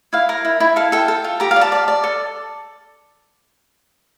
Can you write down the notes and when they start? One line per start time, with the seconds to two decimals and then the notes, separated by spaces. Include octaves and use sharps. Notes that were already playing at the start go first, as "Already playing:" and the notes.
0.13 E4 F5
0.29 A#4
0.45 E4
0.60 E4
0.76 A4 F5
0.92 A4 G5
1.08 A4
1.24 F4
1.40 G4 A#5
1.51 F5
1.56 D5
1.61 A5
1.72 D5
1.88 D5
2.04 A4